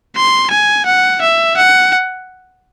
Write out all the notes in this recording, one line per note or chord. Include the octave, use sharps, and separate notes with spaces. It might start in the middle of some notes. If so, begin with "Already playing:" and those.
C6
G#5
F#5
E5
F#5